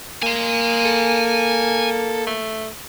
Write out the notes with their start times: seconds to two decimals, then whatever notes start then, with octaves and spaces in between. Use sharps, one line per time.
0.23 A#3 G#5 C6
0.85 A4
2.26 A3